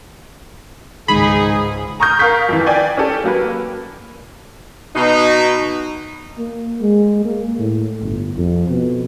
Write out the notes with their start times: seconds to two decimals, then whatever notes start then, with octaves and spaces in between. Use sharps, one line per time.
1.08 C#2 G#2 D#3 G#3 D#4 G#4 B5
2.00 A#5 C#6 D#6 F6 G6
2.19 A#4 F5 C#6 G6 B6
2.49 F2 E3
2.67 D5 G5 G#5
2.97 C#4 G4 A4
3.24 F#3 A#3 B4
4.96 B2 D#4
6.38 A#3
6.81 G#3
7.25 A#3
7.59 A2
8.02 G1
8.36 F2
8.70 B2